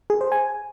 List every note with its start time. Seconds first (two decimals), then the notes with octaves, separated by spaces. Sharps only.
0.10 G#4
0.21 C5
0.32 G#5